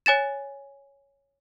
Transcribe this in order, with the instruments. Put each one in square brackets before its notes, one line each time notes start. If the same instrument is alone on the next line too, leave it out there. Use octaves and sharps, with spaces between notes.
[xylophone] C#5 G#5 A6 E7